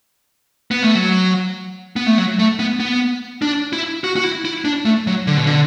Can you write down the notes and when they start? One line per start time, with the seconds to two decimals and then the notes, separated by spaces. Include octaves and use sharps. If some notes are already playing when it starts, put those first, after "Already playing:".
0.71 B3
0.83 A3
0.95 F#3
1.96 B3
2.06 A3
2.18 F#3
2.39 A3
2.59 B3
2.80 B3
3.42 D4
3.73 E4
4.04 F#4
4.16 F#4
4.24 E4
4.45 E4
4.65 D4
4.85 A3
5.07 F#3
5.27 D3
5.37 B2
5.47 D3